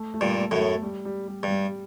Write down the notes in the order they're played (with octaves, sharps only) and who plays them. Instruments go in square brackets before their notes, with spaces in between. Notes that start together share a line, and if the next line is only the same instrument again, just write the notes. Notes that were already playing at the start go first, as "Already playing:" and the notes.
Already playing: [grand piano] A3
A3
[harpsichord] G2 A#2
[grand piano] A3
[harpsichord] F#2 A2
[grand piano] A3
G3
G3
G3
[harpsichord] G2
[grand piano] G3